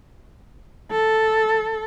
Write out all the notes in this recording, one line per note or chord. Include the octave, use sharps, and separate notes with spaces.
A4